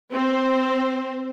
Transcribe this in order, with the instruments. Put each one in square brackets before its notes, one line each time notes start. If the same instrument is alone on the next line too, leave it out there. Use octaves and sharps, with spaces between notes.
[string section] C4 C5